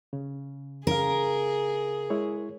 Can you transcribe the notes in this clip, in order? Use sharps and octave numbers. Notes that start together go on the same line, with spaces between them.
C#3
C#3 G#4 A#4 F5
G#3 E4 C#5